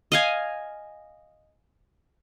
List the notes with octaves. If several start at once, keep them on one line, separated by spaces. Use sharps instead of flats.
D#5 F5 G#5